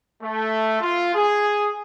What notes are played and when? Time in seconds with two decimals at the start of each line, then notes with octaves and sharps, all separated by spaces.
0.22 A3
0.80 F4
1.15 G#4